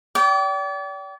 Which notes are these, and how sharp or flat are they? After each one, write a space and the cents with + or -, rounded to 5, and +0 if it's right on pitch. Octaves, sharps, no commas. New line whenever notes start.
D5 -40 G5 -25 D6 +0